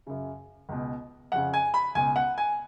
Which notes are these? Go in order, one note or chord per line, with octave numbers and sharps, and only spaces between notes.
F#2 C#3
C#2 B2
F2 C#3 F#5
G#5
B5
C#2 B2 G#5
F#5
G#5